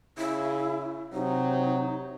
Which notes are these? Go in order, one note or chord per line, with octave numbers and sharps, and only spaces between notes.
C#3 E4
C3 F#3 D#4